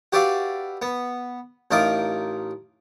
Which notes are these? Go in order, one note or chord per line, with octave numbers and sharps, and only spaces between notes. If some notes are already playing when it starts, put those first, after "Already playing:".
F#4 G4 B4 D5 E5 F5
B3
A1 D#4 F4 A#4 D6